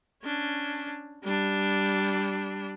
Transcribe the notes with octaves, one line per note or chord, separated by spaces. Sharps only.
C#4 D4
G3 D4